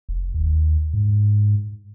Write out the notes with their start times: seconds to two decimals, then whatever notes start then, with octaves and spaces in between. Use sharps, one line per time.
0.09 F1
0.34 D#2
0.94 G#2